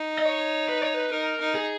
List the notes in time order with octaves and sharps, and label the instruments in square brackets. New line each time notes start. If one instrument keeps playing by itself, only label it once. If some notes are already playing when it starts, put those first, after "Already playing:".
Already playing: [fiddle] D#4
[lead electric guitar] D#5
C#5
B4
C#5
B4
[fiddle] D#4 [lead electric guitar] A#4
[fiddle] D#4
[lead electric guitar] G#4